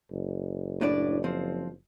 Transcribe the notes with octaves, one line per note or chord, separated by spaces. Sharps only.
F#1
A2 D4 D5
F3 C4